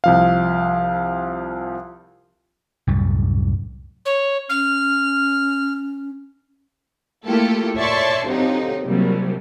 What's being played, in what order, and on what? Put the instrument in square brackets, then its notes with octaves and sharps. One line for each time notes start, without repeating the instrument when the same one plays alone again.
[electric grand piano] C2 F3 F5
[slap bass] C2 F#2 A2 G3
[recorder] C#5
[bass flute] C#4 [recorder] F6
[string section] A3 A#3 E4 F4 G4 A4
C#5 D5 E5 A5 C6 C#6
D3 F3 F#3 C4 D#4 G4
A#1 C3 F#3 G3